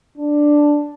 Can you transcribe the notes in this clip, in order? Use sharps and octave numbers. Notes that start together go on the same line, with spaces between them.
D4